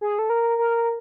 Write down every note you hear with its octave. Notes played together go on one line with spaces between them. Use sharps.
G#4
A4
A#4
A#4